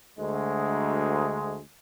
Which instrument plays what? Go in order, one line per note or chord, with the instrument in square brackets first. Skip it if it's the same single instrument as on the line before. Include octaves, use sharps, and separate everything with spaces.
[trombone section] D2 G#3